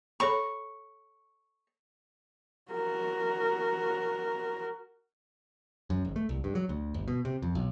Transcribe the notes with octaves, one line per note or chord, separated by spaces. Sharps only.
A4 C#5 B5 C#6
F#4 A#4
F#2
G#1
A3
C2
G2
F#3
D2
G1
B2
C3
F2
B1